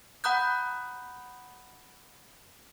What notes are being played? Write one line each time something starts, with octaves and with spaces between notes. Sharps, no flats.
F#5 A#5 B5 D#6 F#6 G6